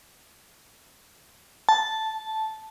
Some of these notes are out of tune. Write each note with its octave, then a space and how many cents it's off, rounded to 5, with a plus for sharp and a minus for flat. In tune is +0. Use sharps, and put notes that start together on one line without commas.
A5 -5